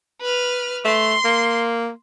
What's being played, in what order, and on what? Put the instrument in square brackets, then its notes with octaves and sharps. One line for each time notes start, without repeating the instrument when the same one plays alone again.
[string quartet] B4 F6
[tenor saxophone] A3 [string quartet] C6
[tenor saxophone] A#3